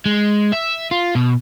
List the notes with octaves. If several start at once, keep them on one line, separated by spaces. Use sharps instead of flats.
G#3
E5
F4
B2